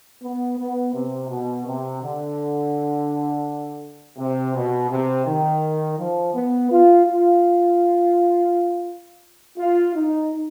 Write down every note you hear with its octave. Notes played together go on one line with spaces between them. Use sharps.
B3
B3
C3
B2
C3
D3
C3
B2
C3
D#3
F3
B3
F4
F4
F4
D#4